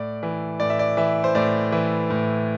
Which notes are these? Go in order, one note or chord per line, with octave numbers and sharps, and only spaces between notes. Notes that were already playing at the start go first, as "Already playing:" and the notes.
Already playing: A2 D5
E3
A2 D5
E5
D5
E3 E5
C5
A2 D5
E3
A2